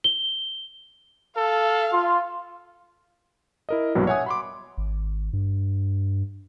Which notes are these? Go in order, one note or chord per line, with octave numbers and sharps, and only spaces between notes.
G7
A4 F5
F4
E4 A#4 D#5
A#1 G2 B2 F#3
C#5 E5 F#5 G#5 D#6
B5 C6 D6
G#1
G2